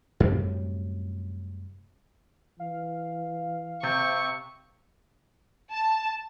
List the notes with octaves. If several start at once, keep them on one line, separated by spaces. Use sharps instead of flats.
F#2 A2 C3 G3
E3 F5
C3 C#6 G6
A5